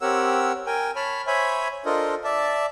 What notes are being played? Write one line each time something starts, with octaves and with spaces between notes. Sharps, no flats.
C4 G4 A#4 C#5 F#5 E6
A#4 G5 G#5
C#5 A5 B5 F6
C5 C#5 E5 G#5 B5
D4 F4 A4 A#4 C5 D#5
D5 E5 A5